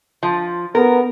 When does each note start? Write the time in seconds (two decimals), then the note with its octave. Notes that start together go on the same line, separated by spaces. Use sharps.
0.23 F3
0.75 B3 A#4